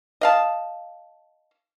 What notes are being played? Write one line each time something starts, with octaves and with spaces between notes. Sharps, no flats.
D#5 F5 A5